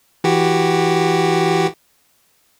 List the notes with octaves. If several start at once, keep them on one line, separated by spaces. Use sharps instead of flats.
E3 F#4 G4